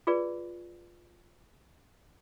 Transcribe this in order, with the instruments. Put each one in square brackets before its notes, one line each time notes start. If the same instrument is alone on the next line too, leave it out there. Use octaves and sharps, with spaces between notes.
[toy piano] F4 G#4 B4 D5